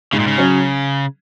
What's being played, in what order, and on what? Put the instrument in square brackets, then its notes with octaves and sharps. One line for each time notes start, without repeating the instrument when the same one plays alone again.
[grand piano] G#2 [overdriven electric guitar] C#3
[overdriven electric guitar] A#2
C#3
[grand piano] F#3 C#4